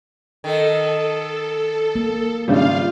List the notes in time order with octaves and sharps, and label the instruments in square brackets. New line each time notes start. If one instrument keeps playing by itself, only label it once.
[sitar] D#3 [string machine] A4
[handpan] A#3
[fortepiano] G#1 C#3 G3 [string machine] F4 F5